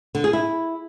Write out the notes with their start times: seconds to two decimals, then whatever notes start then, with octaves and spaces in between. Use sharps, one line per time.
0.15 D3
0.24 G#4
0.33 E4